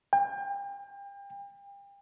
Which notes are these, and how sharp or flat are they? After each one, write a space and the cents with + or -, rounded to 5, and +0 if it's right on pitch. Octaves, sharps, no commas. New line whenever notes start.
G5 +35